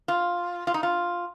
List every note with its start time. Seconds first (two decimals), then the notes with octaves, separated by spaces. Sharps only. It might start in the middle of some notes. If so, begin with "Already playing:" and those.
0.08 F4
0.67 F4
0.74 D#4
0.83 F4